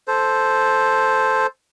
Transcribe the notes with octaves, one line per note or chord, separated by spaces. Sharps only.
A4 C5